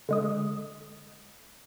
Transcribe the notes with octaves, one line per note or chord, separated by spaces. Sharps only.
D3 G#3 D#6